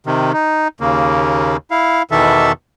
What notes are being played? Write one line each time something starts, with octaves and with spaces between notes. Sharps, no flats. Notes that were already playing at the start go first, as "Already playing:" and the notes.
C3 D#3
D#4
D#2 C#3 A#3
E4 F5
E2 B2 D#3 E3 A4 E5